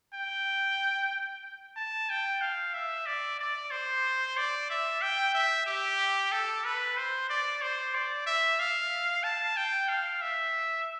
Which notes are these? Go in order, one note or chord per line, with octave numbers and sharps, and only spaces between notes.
G5
A5
G5
F5
E5
D5
D5
C5
D5
E5
G5
E5
G4
A4
B4
C5
D5
C5
D5
E5
F5
A5
G5
F5
E5